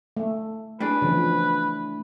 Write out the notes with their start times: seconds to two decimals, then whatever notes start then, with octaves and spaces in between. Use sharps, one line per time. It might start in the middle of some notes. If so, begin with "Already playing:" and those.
0.17 A3
0.80 A2 D4 G#4 B4
1.02 C#3 E3 F3